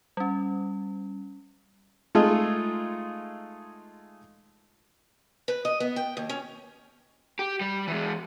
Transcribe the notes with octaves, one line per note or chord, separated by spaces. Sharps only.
G3 C#4
G#3 A3 D#4 F4 G#4 A4
B4
D#5
B3
G5
D#2
C#4
G4
G3
E3 G#3